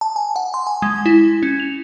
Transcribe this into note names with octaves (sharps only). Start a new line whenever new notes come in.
A5
G#5
F#5
C6
G#5
G#3
E4
C#4
F7